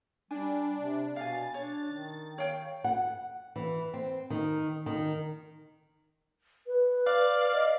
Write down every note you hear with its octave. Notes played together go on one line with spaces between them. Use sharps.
G3 D4 G#5
C3
B2 F5 G#5 A6
D4 C#5
D#3
C#5 F5 G5
F#5
E3
C4
D#3
D#3
B4
D5 F5
D#5